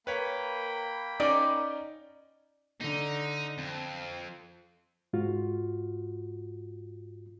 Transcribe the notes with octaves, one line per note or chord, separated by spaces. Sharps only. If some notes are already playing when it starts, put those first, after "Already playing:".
A#3 B4 C#5 G5 B5
C#4 D#4 D5 D#5
D3 D#4
F2 C4
G#2 F4 F#4